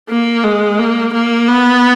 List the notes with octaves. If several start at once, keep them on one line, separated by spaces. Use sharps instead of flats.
A#3
G#3
A#3
A#3
B3